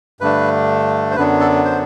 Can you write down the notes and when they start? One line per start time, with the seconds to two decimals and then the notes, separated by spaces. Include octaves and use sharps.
0.21 G2 D3 A3 D4 B4
1.11 C5
1.16 F#2 D3 F#3 B3 D4 B4
1.40 A4
1.65 C5